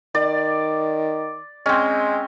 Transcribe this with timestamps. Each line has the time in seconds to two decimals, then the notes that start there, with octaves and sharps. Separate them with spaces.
0.15 D#3 D5
1.66 G#3 C4 C#4